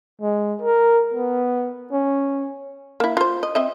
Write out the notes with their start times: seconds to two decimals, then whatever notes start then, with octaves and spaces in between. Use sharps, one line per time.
0.21 G#3
0.61 A#4
1.14 B3
1.92 C#4
3.00 A#3 E4
3.17 F4 C5
3.43 D#5
3.55 C4 D#5 E5